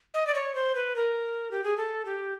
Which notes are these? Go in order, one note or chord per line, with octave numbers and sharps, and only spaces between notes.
D#5
D5
C#5
C5
B4
A#4
G4
G#4
A4
G4